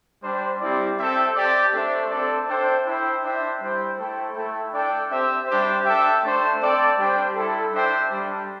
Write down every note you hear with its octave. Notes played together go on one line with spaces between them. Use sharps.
G3 D4 G4 C5
G3 C4 E4 G4 D5
C4 A4 E5 G5
C4 G4 D5
A3 D4 A4 C5 E5
C4 A4 D5
D4 A4 C5 E5 G5
E4 C5 E5 G5
D4 C5 E5 G5
G3 E4 C5 G5
A3 E4 A4 C5 G5
A3 E4 A4 E5 G5
D4 A4 D5 G5
C4 G4 C5 E5
G3 D4 G4 C5
D4 A4 E5 G5
A3 D4 C5
C4 A4 D5 G5
G3 D4 G4 C5 G5
G3 E4 A4
D4 C5 E5 G5
G3 D4 G4 D5 G5